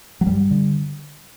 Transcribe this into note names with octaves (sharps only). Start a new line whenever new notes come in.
F#3
G2 G3
D3